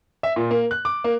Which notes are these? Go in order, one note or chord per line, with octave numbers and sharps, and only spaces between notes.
E5
A#2
A#3
F#6
D6
A#3